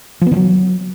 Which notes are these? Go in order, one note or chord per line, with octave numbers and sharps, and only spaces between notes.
F3
B3
D#3
F#3